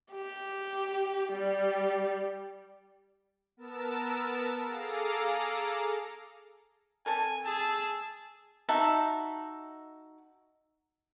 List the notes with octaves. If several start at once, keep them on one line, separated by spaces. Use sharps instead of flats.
G4
G3
B3 A#4 A5 E6
G#4 A4 F5 A#5 D6
C4 A4 A#4 G#5
G#4 A5 E6
D#4 F#4 E5 A5